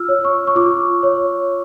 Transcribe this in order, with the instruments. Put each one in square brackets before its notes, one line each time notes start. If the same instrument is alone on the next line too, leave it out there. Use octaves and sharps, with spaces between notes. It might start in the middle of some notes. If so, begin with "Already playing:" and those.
Already playing: [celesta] F4 E6 F6
C#5
C#6
C#6
F4 D6
C#5